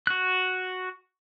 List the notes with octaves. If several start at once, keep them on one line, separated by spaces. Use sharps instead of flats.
F#4 F#6